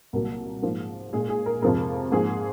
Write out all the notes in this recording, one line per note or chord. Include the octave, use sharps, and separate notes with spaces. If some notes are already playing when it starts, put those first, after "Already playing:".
C2 A#2 F#3 A#3 A#4
G#2 F3 A#3
A#2 G#3 G#4
G#4
A#4
F2 C3 F3 G#3 A#4
G#2 F3 A#3 G#4